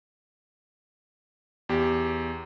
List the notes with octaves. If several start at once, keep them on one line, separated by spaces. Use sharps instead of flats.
E2 G4